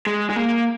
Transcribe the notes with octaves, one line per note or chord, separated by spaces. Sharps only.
G#3
G#3
A#3